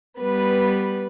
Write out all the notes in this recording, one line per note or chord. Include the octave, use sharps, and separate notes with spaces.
G3 B3 B4